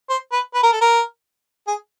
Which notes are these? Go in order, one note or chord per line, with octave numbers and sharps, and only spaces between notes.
C5
B4
B4
A#4
A4
A#4
G#4